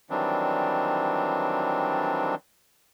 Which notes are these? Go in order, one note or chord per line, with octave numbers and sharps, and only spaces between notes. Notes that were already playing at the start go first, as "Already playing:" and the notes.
D#3 E3 F#3 G3 C4 D4